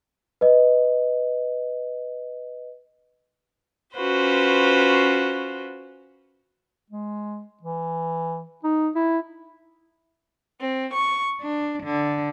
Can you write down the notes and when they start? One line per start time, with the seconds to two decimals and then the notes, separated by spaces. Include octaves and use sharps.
0.41 B4 D#5
3.95 C#4 F4 F#4 B4 C5
6.90 G#3
7.63 E3
8.64 D#4
8.95 E4
10.61 C4
10.93 C#6
11.41 D4
11.83 D3